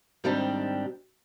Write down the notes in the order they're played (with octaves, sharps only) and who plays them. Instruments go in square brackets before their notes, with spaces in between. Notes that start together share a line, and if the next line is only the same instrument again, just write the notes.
[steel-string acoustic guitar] G#2 D#3 G3 C4 D4 G4